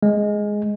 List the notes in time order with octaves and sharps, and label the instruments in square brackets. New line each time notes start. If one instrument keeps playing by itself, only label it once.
[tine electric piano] G#3